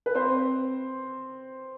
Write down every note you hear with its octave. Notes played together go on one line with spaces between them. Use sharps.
B4
C4 C5